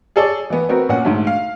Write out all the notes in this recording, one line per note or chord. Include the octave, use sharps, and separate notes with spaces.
G#4 A4 C#5 D5
E3 B3
B3 C4 F#4 A#4
A#2 C#4 F#5
G#2 D3 A3
F5